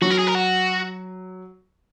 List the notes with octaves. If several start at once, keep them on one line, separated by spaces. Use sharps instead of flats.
F#3 F#4
A#4
G#4
A#4
F#4